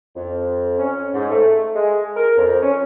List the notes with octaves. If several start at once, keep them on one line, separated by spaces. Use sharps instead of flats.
F2
C#4
G#2
A3
G#3
A#4
F2
C#4